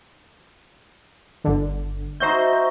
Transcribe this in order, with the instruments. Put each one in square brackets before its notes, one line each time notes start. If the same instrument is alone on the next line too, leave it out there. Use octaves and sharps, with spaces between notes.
[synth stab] G1 D3
[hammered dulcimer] D#4 F#4 E5 [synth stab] C5 G6